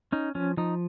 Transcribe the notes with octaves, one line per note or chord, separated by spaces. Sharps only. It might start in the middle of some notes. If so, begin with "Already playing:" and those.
C#4 D#4
F3 C#4
F3 D#4